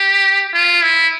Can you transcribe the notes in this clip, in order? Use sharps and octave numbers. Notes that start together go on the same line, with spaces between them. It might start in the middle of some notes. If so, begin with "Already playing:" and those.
Already playing: G4
F4
E4